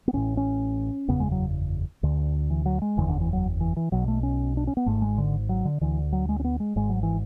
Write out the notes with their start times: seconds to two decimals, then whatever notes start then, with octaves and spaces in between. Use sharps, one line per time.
0.08 B3
0.13 A1 A2 C#4
0.37 C#4
1.08 F#1 E2 C#3 B3
1.20 G#3
1.32 F#3
2.03 D2 D3
2.50 E3
2.66 F#3
2.82 G#3
2.97 F#1 E2 D3 E3
3.09 D3
3.21 E3
3.33 F#3
3.60 E3
3.77 E3
3.92 B1 B2 F#3
4.08 A3
4.23 C#4
4.57 D4
4.67 C#4
4.77 B3
4.86 G#1 G#2 A3
5.02 G#3
5.18 D3
5.49 F#3
5.65 D3
5.81 D2 D3 E3
6.13 F#3
6.29 G#3
6.40 C#4
6.44 B3
6.60 G#3
6.76 G#1 G#2 G#3
6.89 F#3
7.03 E3